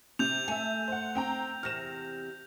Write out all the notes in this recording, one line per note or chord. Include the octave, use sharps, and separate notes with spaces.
C3 G6 F7
A3 E5 G#5
C5 F#5
C4 G5 A#5
E2 C3 F6 A#6 E7